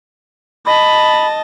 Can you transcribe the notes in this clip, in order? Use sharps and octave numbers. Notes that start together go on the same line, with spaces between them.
D#5 A5 B5